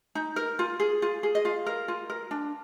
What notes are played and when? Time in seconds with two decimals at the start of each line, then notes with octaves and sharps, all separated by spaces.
0.15 D#4
0.36 A#4
0.59 F4
0.80 G#4
1.02 F4
1.23 G#4
1.35 D#5
1.45 F4 F5
1.66 A#4
1.88 F4
2.10 A#4
2.31 D4